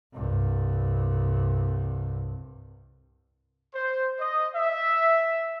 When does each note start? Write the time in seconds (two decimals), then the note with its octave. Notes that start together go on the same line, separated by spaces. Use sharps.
0.14 C2 G2
3.75 C5
4.19 D#5
4.55 E5